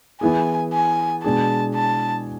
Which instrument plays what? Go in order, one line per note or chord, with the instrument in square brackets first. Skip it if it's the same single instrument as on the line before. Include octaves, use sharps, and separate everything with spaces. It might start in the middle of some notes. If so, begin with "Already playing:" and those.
[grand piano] E3 B3 E4 G#4 [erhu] G#5
[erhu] G#5
[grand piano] B2 G#3 D4 G#4 [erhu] A5
[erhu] A5